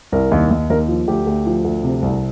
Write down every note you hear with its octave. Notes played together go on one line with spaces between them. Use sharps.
C2 A#4
D#2
D#2
D#2 A#4
F3
D2 G4
D2
F3
D2
C3
C2